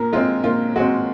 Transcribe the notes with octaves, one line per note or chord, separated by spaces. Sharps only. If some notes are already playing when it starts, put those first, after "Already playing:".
Already playing: A#2 A#4
G#3 C4 F4
A#2 F4
G#3 C4 F#4